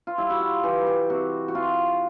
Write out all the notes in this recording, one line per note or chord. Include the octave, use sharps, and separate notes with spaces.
F4
G3 E4
F#4
F4
E3 G4
G4
C3 F#4
F#4
C3 F4